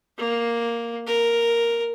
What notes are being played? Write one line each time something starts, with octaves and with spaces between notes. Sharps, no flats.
A#3
A#4